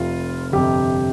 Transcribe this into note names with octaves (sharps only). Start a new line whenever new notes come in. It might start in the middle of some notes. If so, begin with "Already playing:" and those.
Already playing: F1 F2 C3 F4
G1 F2 C3 G4